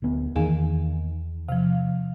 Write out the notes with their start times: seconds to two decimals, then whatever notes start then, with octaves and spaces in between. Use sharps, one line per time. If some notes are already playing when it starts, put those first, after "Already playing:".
0.02 D1 D2 B3
0.36 E2 D#3 A#3 G#4 F5 G#5
1.49 C3 F3 F5